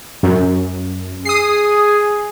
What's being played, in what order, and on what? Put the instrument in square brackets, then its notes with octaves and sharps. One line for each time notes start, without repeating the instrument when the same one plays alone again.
[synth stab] F#2
[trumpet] G#4 [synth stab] D#6 C7